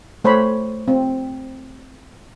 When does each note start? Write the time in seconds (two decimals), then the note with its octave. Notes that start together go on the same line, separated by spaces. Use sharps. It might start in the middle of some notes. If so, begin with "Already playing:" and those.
0.24 A3 C5 C#5 B5
0.88 C4